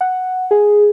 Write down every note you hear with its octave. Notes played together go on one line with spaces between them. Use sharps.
F#5
G#4